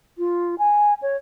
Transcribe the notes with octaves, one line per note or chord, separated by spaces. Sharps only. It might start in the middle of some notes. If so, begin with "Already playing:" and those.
F4
G#5
C#5